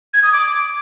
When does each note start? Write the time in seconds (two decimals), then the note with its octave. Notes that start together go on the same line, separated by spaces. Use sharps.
0.14 G#6
0.23 D#6
0.33 D6